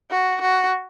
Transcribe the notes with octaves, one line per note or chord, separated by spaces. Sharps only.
F#4
F#4